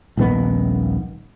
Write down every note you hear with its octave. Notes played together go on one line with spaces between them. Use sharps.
D#1 A#1 D#3 B3